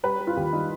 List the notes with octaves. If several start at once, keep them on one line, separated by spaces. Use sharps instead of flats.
G3 B4
G3
F4
D#2 G4
G3 D#4